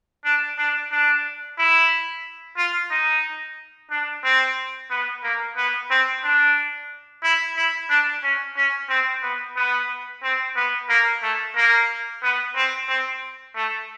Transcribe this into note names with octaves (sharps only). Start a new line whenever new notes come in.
D4
D4
D4
E4
F4
D#4
D4
C4
B3
A#3
B3
C4
D4
E4
E4
D4
C#4
C#4
C4
B3
B3
C4
B3
A#3
A3
A#3
B3
C4
C4
A3